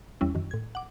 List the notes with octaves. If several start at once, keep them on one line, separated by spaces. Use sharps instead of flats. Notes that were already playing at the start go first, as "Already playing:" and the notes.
E2 G3 C#4 E4
F#2 D#3
A2 G#6
F#5 D6